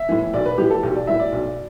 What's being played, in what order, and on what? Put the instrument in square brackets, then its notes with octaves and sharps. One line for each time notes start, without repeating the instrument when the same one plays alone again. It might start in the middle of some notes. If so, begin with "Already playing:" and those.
Already playing: [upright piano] E5
A2 E3
B1 D5
B4
A2 E3 G4
A4
B1 G4
D5
A2 E3 E5
D5
B1